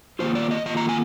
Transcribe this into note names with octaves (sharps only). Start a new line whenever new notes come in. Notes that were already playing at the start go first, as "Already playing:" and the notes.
D#3 A#3 F4 C5
D5
D#5
D#3 A#3 F4 D#5
A#5
G#5